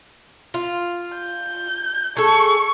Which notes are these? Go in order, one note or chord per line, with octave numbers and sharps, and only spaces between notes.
F4
G6
G#4 A4 C#6